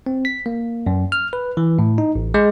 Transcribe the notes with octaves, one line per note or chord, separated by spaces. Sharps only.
C4
B6
A#3
F#2
F6
B4
E3
A2
D#4
A1
G#3